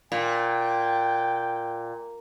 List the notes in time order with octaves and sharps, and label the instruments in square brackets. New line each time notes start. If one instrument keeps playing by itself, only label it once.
[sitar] A#2 [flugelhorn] G5